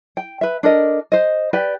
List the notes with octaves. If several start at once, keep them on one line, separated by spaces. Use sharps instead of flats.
G5
B4 E5
D4 A4 A#4 D#5
C5 D#5
G4 B4 D5 G5